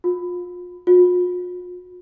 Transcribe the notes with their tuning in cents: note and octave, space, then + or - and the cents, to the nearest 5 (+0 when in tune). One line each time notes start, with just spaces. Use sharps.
F4 +35
F4 +45